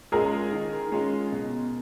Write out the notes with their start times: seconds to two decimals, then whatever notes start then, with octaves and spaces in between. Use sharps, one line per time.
0.12 G#3 C#4 F4 G#4 A#4
0.52 D#3
0.92 G#3 C#4 F4
1.32 B2